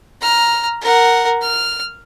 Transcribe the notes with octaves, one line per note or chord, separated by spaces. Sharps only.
A#5 F6
A#4 F#5
F6